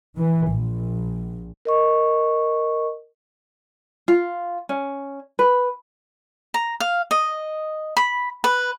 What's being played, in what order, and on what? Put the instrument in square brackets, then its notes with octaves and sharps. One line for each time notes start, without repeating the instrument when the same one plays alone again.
[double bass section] E3
A#1
[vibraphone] A#4 D#5 C#6
[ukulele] F4
C#4
B4
[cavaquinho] A#5
F5
D#5
B5
B4